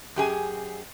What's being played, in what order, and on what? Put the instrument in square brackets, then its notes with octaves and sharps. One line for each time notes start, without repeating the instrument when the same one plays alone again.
[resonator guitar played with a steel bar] F#2 G4 G#4 G#5